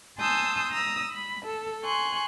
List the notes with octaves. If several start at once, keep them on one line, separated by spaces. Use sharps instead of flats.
G#5 A5 C6 D#6 E6 G6
A#5 D#6 E6
B5
A4
G#5 C6 C#6 F#6